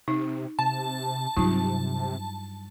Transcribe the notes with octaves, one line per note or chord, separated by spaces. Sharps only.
C3 D#4
C3 A5
G2 C3 F#3 D#4 F4